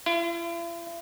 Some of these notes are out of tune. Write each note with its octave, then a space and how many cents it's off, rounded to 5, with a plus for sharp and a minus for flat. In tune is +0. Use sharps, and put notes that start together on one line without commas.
E4 +45